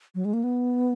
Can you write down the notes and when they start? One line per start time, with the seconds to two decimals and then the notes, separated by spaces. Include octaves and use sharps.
0.15 F#3
0.25 G#3
0.33 A#3
0.44 B3